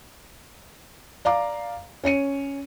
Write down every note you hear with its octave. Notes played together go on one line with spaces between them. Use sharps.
D5 F5 A#5 D6
C#4 C#5 C#7 D#7